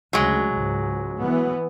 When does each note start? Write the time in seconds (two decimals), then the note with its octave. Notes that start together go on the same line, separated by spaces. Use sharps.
0.13 D2 C#3 F#3 G#3
0.53 C#2 G#2
1.19 E3 B3